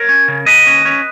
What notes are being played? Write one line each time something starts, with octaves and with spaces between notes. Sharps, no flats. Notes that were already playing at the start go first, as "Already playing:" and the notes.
Already playing: A#4 C#5
C#4
C#3
D#2 B4 D#5
C#4
C#4